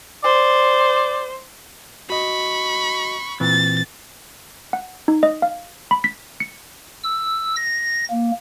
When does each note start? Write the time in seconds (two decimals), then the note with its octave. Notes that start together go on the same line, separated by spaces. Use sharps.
0.24 C5 D5
2.10 F#4 D#5 B5 C#6
3.40 A#2 E3 C4 A6
4.73 F#5
5.08 D#4
5.23 D#5
5.42 F5
5.91 B5
6.04 B6
6.40 C#7
7.04 E6
7.56 A#6
8.10 A#3